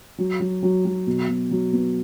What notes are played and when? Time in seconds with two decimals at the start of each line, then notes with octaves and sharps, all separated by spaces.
0.18 F#3
0.40 F#3
0.63 F#3
0.85 F#3
1.07 B2
1.28 B2
1.51 F#3
1.73 B3